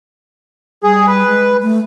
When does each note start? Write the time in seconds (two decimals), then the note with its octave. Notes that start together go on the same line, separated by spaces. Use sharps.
0.83 G3 G#4
1.07 B4
1.27 G#3
1.63 A3